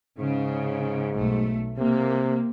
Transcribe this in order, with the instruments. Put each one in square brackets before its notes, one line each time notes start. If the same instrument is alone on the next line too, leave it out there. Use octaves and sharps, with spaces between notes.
[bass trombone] G#2 [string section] C#3
[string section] B1 A3
[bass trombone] C3 [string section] A#3